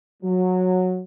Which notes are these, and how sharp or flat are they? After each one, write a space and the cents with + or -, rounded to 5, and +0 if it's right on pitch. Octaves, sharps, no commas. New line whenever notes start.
F#3 -15